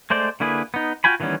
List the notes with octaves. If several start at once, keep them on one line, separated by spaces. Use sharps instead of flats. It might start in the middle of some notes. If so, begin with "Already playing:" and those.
G#3 A3 C5 D5
D3 A#3 E4 G#4 B4
B3 D#4
F4 F#4 G5 G#5 B5
D#3 E3 G3 B3 C#4